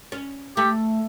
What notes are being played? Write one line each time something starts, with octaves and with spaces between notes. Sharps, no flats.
C#4
A3 G4